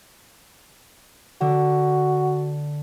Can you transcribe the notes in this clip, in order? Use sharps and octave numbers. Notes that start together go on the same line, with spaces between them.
D3 F#4